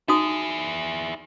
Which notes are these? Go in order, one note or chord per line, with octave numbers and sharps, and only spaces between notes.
D#4 E4 F#4 G#4 D#6